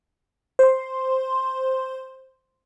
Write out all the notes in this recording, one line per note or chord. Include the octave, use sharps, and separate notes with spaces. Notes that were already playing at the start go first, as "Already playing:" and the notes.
C5 C6